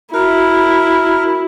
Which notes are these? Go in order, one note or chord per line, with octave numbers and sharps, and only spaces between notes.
E4 F#4 A#4